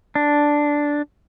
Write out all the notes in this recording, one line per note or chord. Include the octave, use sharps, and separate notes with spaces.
D4